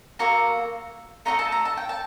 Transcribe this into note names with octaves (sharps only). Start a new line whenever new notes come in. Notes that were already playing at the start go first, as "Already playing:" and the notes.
A#3 F#4 A4 A#5
A3 D#4 F#4 A4 A#5
A5
A#5
A5
G5
A5